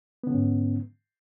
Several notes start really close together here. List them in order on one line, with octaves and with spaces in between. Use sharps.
B3 D3 C#4 G#2